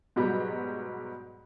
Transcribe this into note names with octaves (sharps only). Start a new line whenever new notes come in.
G#2 B2 F#3 G3